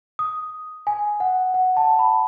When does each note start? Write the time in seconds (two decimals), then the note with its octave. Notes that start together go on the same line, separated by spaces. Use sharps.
0.19 D#6
0.87 G#5
1.20 F#5
1.54 F#5
1.77 A5
1.99 B5